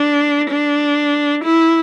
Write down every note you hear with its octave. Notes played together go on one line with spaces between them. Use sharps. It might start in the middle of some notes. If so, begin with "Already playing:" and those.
Already playing: D4
D4
E4